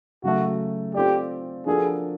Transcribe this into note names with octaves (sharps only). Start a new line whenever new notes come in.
C#3 F#3 A3 F#4
C4 F4 G4 A4 D5
F3 A#3 D4 F#4 G#4 A4